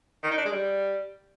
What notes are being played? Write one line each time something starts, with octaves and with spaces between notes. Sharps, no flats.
D#3
D#4
D4
G#3
G3